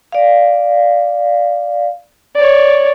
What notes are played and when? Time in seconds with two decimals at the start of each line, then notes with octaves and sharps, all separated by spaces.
0.12 D5 F5
2.35 C#5 D5